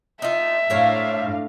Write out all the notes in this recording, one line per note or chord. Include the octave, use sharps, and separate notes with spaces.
D#4 F4 E5
A2 D4 A#4 C5 C#5 F5